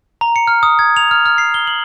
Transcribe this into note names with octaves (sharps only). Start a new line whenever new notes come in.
A#5
C#7
F6
D#6
G#6
F7
F6
F6
C7
G7
F#7